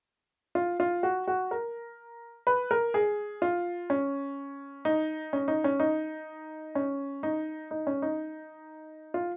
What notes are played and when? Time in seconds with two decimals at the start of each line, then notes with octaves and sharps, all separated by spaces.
0.55 F4
0.80 F4
1.03 F#4
1.28 F#4
1.51 A#4
2.47 B4
2.71 A#4
2.94 G#4
3.42 F4
3.90 C#4
4.85 D#4
5.33 C#4
5.48 D#4
5.64 C#4
5.80 D#4
6.75 C#4
7.23 D#4
7.71 D#4
7.87 C#4
8.02 D#4
9.14 F4